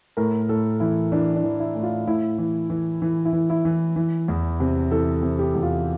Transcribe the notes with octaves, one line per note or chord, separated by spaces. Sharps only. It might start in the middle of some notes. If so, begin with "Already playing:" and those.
A2 A#4
A2 A4
E3 E4
E3 D4
D4
E3
E4
A2
F4
A2 E4
E3
E3
E3
E4
E3
E4
E3
E3
E2
C3
E3 A4
C3
G4
E2
F4